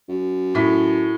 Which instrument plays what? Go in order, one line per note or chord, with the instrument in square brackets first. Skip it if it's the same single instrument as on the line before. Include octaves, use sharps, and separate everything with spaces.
[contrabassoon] F#2
[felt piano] A2 B6